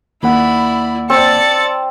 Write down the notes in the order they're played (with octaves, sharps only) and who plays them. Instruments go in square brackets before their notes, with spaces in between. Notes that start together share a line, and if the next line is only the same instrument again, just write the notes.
[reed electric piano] D#2 A#3 F#5 [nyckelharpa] E4 D5 [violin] B5
[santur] C4 [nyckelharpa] D5 A5 [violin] A6 C#7